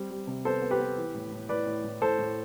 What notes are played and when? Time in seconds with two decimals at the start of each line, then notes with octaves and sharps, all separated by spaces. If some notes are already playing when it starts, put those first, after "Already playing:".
Already playing: G3 C4
0.10 G3
0.27 C3
0.45 B3 A4 C5
0.62 B3
0.71 G4 B4
0.80 B3
0.97 E3
1.14 A2
1.32 A2
1.49 A2 B4 D5
1.67 A2
1.84 A2
2.01 A2 A4 C5
2.19 A2